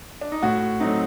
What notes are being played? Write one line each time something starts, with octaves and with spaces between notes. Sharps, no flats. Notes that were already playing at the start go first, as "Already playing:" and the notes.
D4
D#4
A2 F#4
F#3 A3 C4 D#4